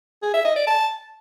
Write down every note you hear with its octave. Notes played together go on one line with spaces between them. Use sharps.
G#4
E5
D#5
D5
A5